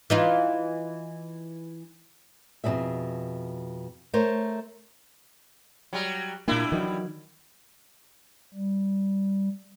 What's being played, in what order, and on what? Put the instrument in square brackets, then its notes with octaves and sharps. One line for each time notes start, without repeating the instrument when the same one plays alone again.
[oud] E3 D#4 F4
[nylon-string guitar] F2 B2 E3 F#3 G#4 E5
A3 A#4 C5 C#5
[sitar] F#3 G3
[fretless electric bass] A#2 A#3 [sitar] G3 D4 E4
[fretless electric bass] D#3 E3 F#3
[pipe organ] G3